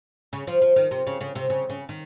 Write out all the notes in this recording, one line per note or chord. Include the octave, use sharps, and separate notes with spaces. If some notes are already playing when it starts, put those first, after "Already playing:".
C#3
F3
F3
D#3
C3
C#3
C#3
C3
C#3
C#3
D#3